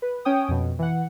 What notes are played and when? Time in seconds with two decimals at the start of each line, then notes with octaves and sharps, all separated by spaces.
0.02 B4
0.25 C#4 C#5 G5 D#6
0.48 F2 B2
0.79 E3 F#5